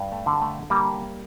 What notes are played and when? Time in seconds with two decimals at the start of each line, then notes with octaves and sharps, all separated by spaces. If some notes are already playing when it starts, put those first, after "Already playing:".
Already playing: G2
0.12 A3
0.26 D3
0.42 A3
0.70 G3 A#3